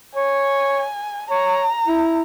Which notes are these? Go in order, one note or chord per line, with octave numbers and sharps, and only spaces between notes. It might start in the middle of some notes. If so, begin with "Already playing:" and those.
C#5 G#5
C#5 A#5
E4